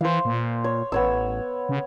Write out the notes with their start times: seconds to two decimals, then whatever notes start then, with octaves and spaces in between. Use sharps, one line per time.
0.01 E3 C5 F5
0.25 A#2
0.64 C#5
0.92 A1 B3 C#5 E6
1.69 C#3